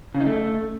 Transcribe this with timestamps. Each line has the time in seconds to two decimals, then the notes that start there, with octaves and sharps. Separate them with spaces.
0.15 C#3
0.20 D#4
0.26 A3